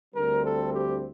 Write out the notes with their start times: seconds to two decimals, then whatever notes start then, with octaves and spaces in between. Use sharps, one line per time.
0.15 D2 D3 G3 C4 A#4
0.45 A4
0.74 G4